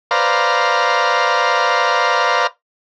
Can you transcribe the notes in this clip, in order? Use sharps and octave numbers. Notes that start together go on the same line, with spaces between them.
B4 C5 D5 F5 A#5